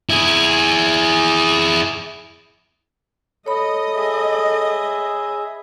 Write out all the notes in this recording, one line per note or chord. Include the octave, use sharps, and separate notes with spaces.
E4 G#4
A4 C#5 D#5 B5
G#4 E5